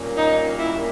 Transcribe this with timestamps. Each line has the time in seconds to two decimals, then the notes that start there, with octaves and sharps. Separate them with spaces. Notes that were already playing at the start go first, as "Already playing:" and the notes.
Already playing: A#2 G3 A#3 C#4
0.17 D#4
0.59 E4